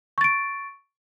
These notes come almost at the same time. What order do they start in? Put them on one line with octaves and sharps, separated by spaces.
C#6 A6 D7